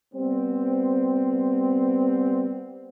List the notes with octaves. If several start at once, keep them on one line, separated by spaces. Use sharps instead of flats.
G3 B3 C4